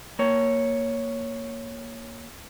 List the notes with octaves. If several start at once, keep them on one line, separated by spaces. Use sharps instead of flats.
A#3 C#5